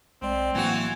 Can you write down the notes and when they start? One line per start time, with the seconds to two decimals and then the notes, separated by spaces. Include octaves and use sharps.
0.22 B1 G#3 C4 D5
0.55 A2 E3 F#3 A#3 F#4 G#5